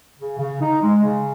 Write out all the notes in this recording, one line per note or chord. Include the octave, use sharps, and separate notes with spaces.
C#3
C#3
D#4
G#3
C#3